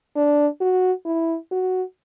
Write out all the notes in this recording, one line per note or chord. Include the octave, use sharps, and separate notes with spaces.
D4
F#4
E4
F#4